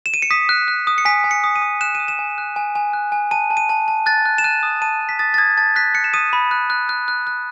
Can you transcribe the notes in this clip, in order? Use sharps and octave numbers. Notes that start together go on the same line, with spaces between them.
E7
D#7
C#7
D#6 B6
F#6
F#6
D#6
C#7
G#5 B6
G#5
C#7
D#6
D#7
D#6
F#6 E7
D#7
D#6
E7
G#5
F#6
G#5
G#5
F#6
G#5
A5 D#7
A5
D#7
A5
A5
F#6 A6
F#6
E7
F#6 D#7
D#6
A5 D#7
A5
B6
D#6 A6
A6
D#6 G#6
A5 A6
F#6 B6
F#6 C#7
E7
D#6 D#7
B5
F#6
F#6
F#6
F#6
F#6